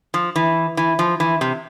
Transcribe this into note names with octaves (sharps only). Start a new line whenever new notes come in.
F3
E3
E3
F3
E3
C3